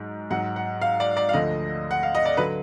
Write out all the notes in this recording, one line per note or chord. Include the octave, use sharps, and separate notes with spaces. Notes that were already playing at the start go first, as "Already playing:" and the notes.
Already playing: G#2 F#3
G#2 F#3 F#5
F#5
F5
D5
D5
F5
D2 D3 F3 D#5
F#5
F5
D#5
D5
D3 F#3 B4